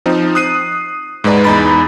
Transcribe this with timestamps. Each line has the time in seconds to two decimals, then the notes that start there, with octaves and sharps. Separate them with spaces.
0.06 F3 C4 D#4
0.35 D#6 F#6 C7 D#7
1.24 G#2 G#3 B4 D5 A#5
1.44 E2 G#3 D#4 A#5 B5 A6